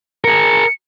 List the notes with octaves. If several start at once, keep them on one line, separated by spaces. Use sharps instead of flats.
G#4 A#4 C#7